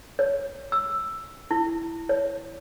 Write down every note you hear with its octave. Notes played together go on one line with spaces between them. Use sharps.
C#5
E6
E4
C#5